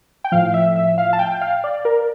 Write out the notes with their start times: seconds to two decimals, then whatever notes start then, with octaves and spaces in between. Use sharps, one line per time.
0.24 G5
0.32 A2 F3 F5
0.54 E5
0.76 E5
0.98 F5
1.13 A5
1.19 G5
1.41 F5
1.64 D5
1.85 A#4